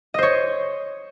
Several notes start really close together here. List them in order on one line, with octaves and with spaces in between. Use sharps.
D#5 C5 C#5